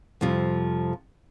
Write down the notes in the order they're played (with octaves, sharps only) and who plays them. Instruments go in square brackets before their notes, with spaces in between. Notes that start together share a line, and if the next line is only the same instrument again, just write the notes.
[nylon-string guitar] F2 C3 F3 G3